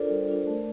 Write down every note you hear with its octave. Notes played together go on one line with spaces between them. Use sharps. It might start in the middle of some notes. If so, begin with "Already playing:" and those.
Already playing: D4 F4 A4 A#4 C5 D5
G3
D4 F4
A3